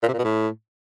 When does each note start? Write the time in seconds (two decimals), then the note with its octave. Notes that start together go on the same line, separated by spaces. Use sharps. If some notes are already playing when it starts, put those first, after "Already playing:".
0.03 A#2
0.08 C3
0.14 A#2
0.19 B2
0.24 A2